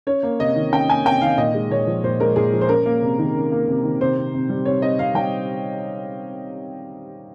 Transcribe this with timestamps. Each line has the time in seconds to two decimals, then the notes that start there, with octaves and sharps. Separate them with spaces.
0.07 C#4 C#5
0.23 A#3
0.40 C3 D#5
0.56 D#3
0.72 C#4 G5
0.88 A#3 G#5
1.05 C3 G5
1.21 D#3 F5
1.37 A#2 D#5
1.54 G#3
1.70 A#2 C#5
1.87 F3
2.04 A#2 C5
2.20 G#3 A#4
2.36 A#2 G#4
2.53 F3
2.61 C5
2.69 C#4 A#4
2.86 A#3
3.02 C3
3.19 D#3
3.35 C#4
3.52 A#3
3.68 C3
3.83 D#3
4.00 C3 C5
4.17 C4
4.34 C3
4.49 G3
4.65 C3 C#5
4.82 C4 D#5
4.99 C3 F5
5.15 G3 G5